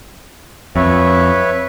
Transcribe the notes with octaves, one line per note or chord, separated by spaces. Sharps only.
F2 B4 C#5 E5